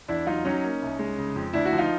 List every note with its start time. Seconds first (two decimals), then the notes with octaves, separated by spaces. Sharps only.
0.08 E2 D4 E4
0.27 F#3 D#4 F4
0.45 F#3 C#4 D#4
0.64 A#3
0.82 C2
0.99 G#3
1.18 C#3
1.36 F2
1.53 D2 D4 E4
1.66 E4 F#4
1.73 F3
1.78 D#4 F4